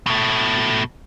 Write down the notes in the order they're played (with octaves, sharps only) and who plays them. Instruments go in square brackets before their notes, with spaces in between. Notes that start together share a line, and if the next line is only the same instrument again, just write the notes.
[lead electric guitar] B2 A3